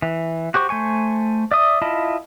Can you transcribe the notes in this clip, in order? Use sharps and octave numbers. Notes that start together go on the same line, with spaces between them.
E3
F#4 G4 C5 C#6
A3 C5 G#5 C#6
D5 E5 D#6
E4 F4 D#5 A5 B5